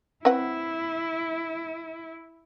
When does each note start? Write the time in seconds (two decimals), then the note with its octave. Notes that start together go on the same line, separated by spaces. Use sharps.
0.25 C4 E4 B4 F#5